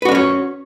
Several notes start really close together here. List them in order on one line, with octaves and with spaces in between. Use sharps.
B4 F#4 D4 C#4 C#5